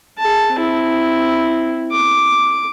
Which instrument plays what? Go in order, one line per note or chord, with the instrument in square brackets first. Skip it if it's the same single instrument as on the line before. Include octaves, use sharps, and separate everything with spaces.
[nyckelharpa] G#4 A5
C4 E4
D6